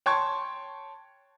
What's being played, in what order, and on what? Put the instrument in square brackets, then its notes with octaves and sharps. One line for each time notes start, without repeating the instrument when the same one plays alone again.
[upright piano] C#5 G5 A5 C6 C#6 G#6